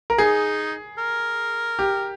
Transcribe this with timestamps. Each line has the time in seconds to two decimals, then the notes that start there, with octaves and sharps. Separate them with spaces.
0.10 A#4
0.18 D#4 G#4
0.98 A#4
1.79 G4